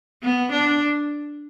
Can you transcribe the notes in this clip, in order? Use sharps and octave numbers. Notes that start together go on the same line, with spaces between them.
B3
D4